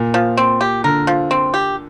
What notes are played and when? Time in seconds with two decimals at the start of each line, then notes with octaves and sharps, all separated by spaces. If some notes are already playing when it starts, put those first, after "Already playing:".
Already playing: A#2
0.14 F3
0.37 C4
0.61 G4
0.84 D3 A#4
1.07 F3
1.31 C4
1.54 G4